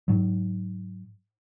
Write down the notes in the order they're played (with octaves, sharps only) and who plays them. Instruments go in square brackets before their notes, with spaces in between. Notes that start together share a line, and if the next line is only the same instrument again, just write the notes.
[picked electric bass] G#2 F#3